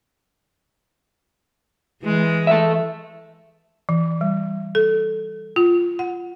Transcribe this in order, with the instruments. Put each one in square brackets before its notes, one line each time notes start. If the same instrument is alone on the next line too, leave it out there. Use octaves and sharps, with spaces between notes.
[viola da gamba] E3 G#3
[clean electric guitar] A4 E5
[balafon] E3
G3
A4
F4
F#5